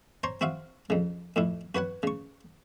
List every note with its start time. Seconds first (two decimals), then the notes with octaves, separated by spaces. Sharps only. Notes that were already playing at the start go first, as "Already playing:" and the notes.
0.23 C5 C#5 A#5 C6
0.41 C4 F#4 E5 F5
0.90 F2 C#3
1.36 F2 A2 E4
1.75 F#4 B4 C#5 F#5
2.03 C#3 C#6